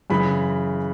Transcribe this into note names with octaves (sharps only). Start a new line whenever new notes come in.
F#2 C#3 E3 B5